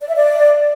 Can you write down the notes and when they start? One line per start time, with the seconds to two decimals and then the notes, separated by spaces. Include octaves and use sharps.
0.01 D5
0.08 E5
0.15 D5